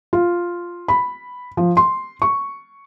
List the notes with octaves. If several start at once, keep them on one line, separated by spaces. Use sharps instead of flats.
F4
B5
F3
C6
C#6